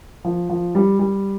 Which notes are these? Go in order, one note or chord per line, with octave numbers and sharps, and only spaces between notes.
F3
F3
G3
G3